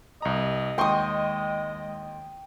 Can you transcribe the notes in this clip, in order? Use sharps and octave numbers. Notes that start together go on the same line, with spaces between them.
C2 D#5 A#5
D#2 G#3 G5 C6 C#6 D#6